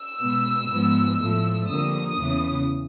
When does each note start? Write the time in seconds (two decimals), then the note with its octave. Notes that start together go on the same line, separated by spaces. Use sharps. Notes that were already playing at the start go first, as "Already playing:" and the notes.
Already playing: E6
0.21 B2 G#3 B3
0.69 G#2 F3 G#3 B3
1.19 A2 F3 A3
1.68 F2 D3 G3 A#3 D#6
2.17 E2 C#3 E3